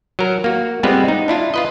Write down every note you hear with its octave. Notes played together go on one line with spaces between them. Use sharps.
F#3 A#4
A#3 F#4
G3 G#3 B3 C4 F4 B4
D#4
D4 E4 F4
F4 B4 D#5